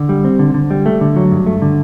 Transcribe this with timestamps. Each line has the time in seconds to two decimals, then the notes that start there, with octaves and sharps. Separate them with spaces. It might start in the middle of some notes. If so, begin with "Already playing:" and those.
Already playing: D3
0.09 G3
0.25 C4
0.39 D3
0.54 D3
0.71 G3
0.86 A3
1.01 D3
1.16 F#3
1.31 G2
1.46 A3
1.62 D3